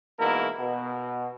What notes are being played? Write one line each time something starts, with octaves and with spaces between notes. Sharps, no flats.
G#2 B2 E3 A#3 E4 A#4
B2